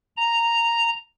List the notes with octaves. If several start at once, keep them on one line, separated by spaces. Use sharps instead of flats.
A#5